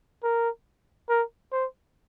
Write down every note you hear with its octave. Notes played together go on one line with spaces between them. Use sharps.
A#4
A#4
C5